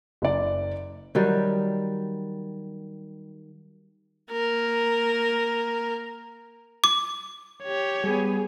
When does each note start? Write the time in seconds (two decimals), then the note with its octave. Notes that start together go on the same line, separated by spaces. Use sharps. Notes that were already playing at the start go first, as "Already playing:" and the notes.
0.22 F#1 D5
1.15 D#3 F#3 G3
4.31 A#3 A#4
6.84 D6
7.64 G4 C#5
8.04 G3 B3 G#4